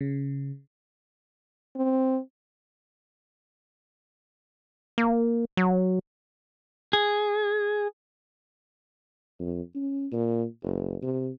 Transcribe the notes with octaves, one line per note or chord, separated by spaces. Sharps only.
C#3
C4
A#3
F#3
G#4
F2
C#4
A#2
F#1
C3